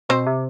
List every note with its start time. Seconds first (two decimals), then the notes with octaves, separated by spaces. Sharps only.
0.09 B2 C4 C5
0.27 C3